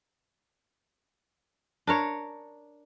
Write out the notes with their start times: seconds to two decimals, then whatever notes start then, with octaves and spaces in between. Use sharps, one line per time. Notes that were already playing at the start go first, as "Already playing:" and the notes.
1.87 D4 A#4 C#5